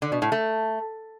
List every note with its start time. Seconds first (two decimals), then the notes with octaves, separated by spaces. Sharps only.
0.02 D3
0.12 B2
0.22 A2
0.32 A3